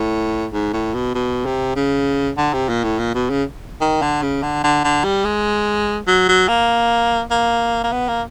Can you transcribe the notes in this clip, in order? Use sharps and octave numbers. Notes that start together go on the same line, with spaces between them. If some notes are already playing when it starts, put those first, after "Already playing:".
Already playing: A2
G#2
A2
B2
B2
C3
C#3
D3
C3
A#2
A2
A#2
B2
C#3
D#3
D3
C#3
D3
D3
D3
G3
G#3
F#3
F#3
A#3
A#3
A#3
B3
A#3